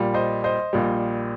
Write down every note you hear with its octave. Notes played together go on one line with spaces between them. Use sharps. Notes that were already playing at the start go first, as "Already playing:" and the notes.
Already playing: A#1 A#2 G3
C5 D#5
C5 D#5
A#1 A#2 G3